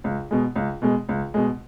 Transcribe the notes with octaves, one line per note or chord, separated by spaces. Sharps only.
C#2
B2 G#3
C#2
B2 G#3
C#2
B2 G#3